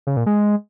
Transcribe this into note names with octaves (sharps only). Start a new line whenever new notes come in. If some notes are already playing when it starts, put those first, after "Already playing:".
C#3
A#2
G#3